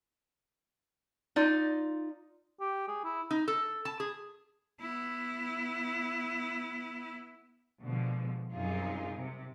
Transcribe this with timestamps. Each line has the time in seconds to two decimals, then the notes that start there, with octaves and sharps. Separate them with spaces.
1.36 D#4 F4 D5
2.61 G4
2.88 G#4
3.04 E4
3.31 D#4
3.48 A4
3.85 A5
4.00 G#4
4.81 B3 E4
7.84 B2 D3 F3 G#3
8.53 F#2 C3 G3 D#4 F4 G#4
9.16 C3